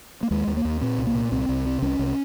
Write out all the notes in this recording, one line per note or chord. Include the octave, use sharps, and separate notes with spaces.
A#3
D#2 G#3
D#2
A#3
D#2
A#2 C4
C2
A#3
A#2
C2 C4
C2
C3
C2 C#4
C2